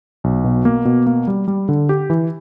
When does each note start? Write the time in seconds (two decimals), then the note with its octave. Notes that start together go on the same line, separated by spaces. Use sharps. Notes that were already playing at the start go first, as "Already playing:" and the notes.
0.24 B1
0.44 B2
0.65 A#3
0.85 B2
1.06 A#3
1.27 G3
1.48 G3
1.69 D3
1.89 G4
2.10 E3